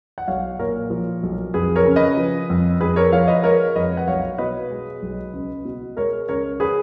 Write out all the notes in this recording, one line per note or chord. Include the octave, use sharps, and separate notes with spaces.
F#5
B1 C#5 F5
A#2 A#4 C#5
F3
B1
F2 G#4 B4
A#4 C#5
C#3
B4 D#5
F3
F2
F2 G#4 B4
A#4 C#5
F3 C#5 F5
B4 D#5
G#3 A#4 C#5
F2 B4 D#5
F#5
B1 C#5 F5
B2 B4 D#5
G#3
B1
C#2
B2
G#3 A#4 C#5
C#2 A#4 C#5
G#4 B4